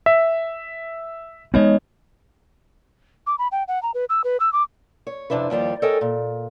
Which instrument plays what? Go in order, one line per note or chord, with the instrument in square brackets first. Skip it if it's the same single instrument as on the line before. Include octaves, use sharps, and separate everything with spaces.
[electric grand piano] E5
[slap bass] G#3 A#3 B3 [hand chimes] D#4 C#5 D#5
[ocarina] D6
B5
G5
F#5
A#5
B4
E6
B4
E6
D6
[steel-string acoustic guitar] C#5
F2 C3 D4 E4 B4
D#2 F3 G3 G4
A4 A#4 C#5 D#5 G5 G#5
A#2